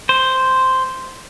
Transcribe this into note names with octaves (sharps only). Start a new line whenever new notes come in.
C5